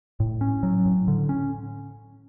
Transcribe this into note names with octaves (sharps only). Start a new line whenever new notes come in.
A2
C#4
F#3
A2
D3
C#4